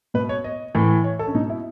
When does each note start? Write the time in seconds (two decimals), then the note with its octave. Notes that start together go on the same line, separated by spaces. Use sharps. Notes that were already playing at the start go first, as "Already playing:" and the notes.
0.14 B2 B4
0.29 C#5
0.44 D#5
0.75 A2 E3
1.04 C#5
1.19 A4
1.27 C#4
1.35 B2 D#4
1.50 E4